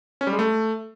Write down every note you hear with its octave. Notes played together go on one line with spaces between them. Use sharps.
C#4
G3
G#3
A3